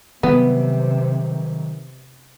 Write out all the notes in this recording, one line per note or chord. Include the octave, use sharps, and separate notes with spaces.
C3 D#3 F#3 G3 B3